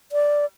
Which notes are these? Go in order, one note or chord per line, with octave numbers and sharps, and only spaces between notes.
D5